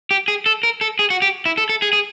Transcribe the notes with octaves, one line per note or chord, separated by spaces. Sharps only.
G4
G#4
A4
A#4
A4
G#4
F#4
G4
E4
A4
A4
G#4
G#4